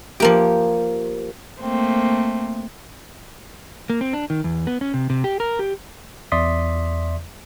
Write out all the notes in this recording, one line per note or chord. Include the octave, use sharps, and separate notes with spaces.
F3 A#3 G4
A3 A#3 C4
A#3
C4
D4
D#3
E2
B3
C#4
C3
C3
G4
A#4
G4
E2 D5 E5 C6 D#6 B6